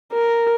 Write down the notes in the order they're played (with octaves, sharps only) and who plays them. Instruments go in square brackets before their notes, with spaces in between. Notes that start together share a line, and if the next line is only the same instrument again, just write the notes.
[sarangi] A#4